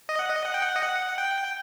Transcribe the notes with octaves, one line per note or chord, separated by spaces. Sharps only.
D#5
F#5
D#5
F#5
G5
F#5
D#5
F#5
G5